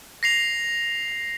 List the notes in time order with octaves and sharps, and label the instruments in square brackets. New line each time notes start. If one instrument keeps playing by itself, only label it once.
[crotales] A#6 C7 F7